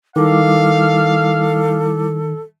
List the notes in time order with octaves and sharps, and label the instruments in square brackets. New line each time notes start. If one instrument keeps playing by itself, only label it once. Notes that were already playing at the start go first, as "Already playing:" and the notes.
[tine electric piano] D#3 [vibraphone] G3 E4 D6 [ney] A4 [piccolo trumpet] F5